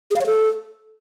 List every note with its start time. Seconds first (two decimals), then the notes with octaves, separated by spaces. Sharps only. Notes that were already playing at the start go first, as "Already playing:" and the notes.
0.11 G#4
0.16 F5
0.21 C#5
0.26 A4